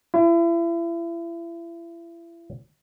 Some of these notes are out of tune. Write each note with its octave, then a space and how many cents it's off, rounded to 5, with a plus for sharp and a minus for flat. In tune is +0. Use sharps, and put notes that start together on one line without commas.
E4 +35